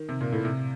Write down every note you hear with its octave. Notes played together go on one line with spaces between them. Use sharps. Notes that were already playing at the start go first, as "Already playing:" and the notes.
Already playing: D#3
C3
A#2
A2
C3